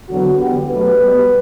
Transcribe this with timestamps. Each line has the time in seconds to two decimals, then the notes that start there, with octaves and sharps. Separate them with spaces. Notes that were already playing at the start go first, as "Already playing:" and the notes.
0.09 E2 D3 F#3 B3 F#4
0.39 E2 D3 G3 B3 G4
0.69 B2 F#3 A3 B4
1.00 B2 G3 B3